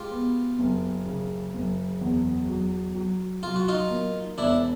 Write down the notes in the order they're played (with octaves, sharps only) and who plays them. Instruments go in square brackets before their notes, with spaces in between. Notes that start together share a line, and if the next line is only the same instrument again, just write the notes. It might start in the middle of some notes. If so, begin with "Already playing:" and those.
Already playing: [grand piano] G#3 [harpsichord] F4 G4
[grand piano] B3
F#1
C#3
F#1
E2
F#3
F#3
[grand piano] F#3 [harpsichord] F4
[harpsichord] F#4
D#4 F4
[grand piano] A#3
[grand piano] E1 [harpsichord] D4 E4